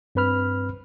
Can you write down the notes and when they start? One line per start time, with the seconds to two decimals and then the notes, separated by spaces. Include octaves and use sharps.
0.15 G2 C4 B4 B5 F6